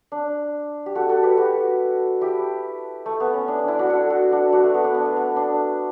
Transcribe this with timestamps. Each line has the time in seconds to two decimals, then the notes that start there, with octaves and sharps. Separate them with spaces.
0.12 D4
0.86 G4
0.95 F#4 A4
1.09 F#4 A4
1.23 G4 B4
1.37 F#4 A4
2.21 E4 G4
3.06 A3
3.20 B3
3.34 C#4
3.48 D4
3.59 D4
3.68 E4
3.79 D4 F#4
3.89 F#4 A4
4.10 F#4 A4
4.31 D4 F#4
4.53 D4 F#4
4.64 A3
4.74 B3
4.84 D4
4.94 B3
5.05 A3
5.16 B3
5.36 D4